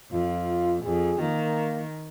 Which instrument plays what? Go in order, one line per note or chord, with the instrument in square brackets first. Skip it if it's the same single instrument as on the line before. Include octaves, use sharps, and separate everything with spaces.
[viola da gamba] F2 [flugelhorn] F4
[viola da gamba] F2 [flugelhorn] G#4
[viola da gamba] D#3 [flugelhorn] A#3